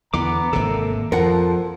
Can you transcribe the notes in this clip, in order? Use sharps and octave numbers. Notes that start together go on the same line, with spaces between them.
E2 D3 B3 A#5 D6
G#1 C3 A#3 A4
F2 F3 A4 A#4 F#5